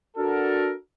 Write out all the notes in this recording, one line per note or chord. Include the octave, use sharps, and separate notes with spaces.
D4 F#4 A4 A#4